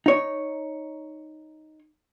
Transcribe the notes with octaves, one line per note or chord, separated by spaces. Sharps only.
D#4 C#5